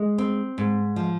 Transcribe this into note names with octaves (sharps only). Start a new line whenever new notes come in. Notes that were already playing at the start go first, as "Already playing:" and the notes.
Already playing: G#3
C4
G#2
F3